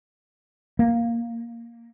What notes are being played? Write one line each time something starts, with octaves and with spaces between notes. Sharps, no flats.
A#3